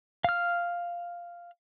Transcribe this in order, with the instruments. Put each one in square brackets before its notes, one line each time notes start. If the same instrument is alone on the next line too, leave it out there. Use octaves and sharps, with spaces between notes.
[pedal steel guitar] F5 F6